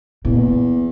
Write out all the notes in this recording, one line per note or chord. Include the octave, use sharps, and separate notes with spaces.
E2 A#2